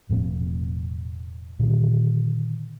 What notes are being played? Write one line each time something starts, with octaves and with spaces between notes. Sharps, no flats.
E1 A2 F3 C4
A#2 D3 D#3 B3